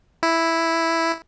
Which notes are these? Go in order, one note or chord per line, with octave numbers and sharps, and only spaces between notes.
E4